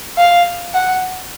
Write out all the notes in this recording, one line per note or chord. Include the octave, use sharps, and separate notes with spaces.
F5
F#5